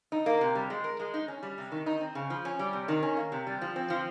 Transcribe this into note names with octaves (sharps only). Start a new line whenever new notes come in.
D#4
A#3
C3
G3
G#3
A#4
G#3
D#4
C#4
G3
C3
D#3
D#4
C4
C#3
F3
C#4
G3
C3
D#3
C#4
A#3
C3
G3
F3
C4
F3